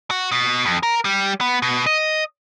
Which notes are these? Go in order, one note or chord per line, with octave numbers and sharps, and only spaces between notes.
F#4
B2
F2
A#4
G3
B3
B2
D#5